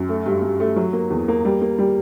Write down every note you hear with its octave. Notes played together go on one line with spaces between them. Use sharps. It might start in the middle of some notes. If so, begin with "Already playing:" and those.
Already playing: F#2
A3
G2
G2
A3
F#3
A#3
E2
A#3
G3
A#3
G3